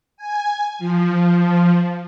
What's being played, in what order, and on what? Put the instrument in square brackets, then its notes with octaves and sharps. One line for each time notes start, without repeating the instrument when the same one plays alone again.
[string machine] G#5
F3